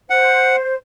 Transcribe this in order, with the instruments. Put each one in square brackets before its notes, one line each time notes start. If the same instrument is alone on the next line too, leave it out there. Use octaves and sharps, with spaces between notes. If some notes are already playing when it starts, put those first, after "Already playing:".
[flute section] C5 [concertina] F#5